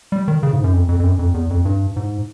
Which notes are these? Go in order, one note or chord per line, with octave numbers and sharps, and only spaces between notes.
G3
D#3
C#3
G#2
F#2
F2
F2
F2
F#2
F2
E2
F2
G2
G#2